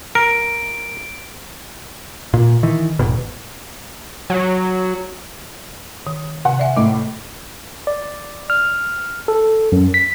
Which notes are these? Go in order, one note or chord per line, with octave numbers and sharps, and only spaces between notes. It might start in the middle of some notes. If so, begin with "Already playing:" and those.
A#4 D7
A#2
D#3 E3
D#1 G#1 B2
F#3
D#3
C3 F#5
D5 E5 G#5
A2 D#5 D6
D5
F6
A4
F#2
B6